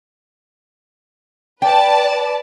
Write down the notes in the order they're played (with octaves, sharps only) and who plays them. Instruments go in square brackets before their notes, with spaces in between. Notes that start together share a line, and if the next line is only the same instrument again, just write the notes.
[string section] B4 D5 A5 [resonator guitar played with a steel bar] G5